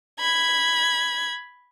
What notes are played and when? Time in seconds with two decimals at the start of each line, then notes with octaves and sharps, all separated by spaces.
0.20 B5 G#6